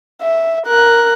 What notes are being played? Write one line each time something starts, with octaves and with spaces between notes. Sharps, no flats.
E5
A#4 F#6